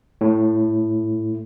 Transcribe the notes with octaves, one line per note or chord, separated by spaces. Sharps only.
A2